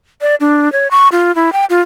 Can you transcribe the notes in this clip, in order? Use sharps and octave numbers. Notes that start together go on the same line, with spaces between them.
D5
D4
C#5
C#6
F4
E4
G5
F4